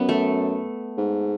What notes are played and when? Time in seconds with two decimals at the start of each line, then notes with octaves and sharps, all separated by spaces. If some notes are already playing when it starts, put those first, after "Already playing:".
Already playing: F#2 B3
0.09 A3
0.97 G#2